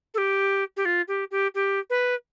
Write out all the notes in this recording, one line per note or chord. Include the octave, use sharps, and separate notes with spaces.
A4
G4
G4
F4
G4
G4
G4
B4